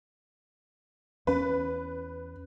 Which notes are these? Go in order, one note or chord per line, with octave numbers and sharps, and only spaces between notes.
E2 C#4 B4